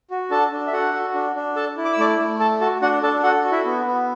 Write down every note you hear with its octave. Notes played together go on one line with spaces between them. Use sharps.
F#4
D4 A4 A5
D4
E5
F#4 A4 F#5
F#4
D4
D4
A4 A5
E4
D6
E6
A3 D5 D6
A3
A4 A5
F#4 A4 A5
D4 F#4 F#5
D4 A4 A5
F#4 A4 F#5
F#4
E4 E5
B3
B3